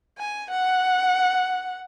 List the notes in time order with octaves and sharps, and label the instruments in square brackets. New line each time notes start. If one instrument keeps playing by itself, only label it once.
[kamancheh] G#5
F#5